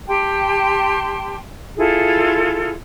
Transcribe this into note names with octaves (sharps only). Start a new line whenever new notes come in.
G4 G5 A5 C6
E4 F4 G#4 A4